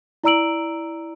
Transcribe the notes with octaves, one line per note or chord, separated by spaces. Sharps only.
E4 D5 A#5 E6 D7 F#7